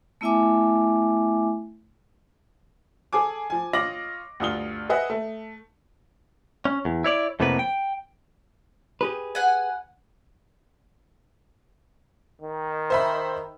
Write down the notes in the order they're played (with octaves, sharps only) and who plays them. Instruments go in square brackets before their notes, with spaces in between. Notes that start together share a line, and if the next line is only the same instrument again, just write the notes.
[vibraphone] A3 B3 E4 E5 G#5 D6
[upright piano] G#4 A4 G#5 D6
F3 G#5
F4 C#5 D#5 D6 A#6 F#7
D2 G2 F4 D#6 G7
G#4 B4 D#5 E5 F#5
A3
[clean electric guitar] C#4
E2
E4 C#5 D5
F2 A2 C3 A#3 B3 B4
G5
[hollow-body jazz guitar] G4 G#4 B4
[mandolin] F#5 G#5
[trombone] D#3
[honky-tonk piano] C5 E5 B5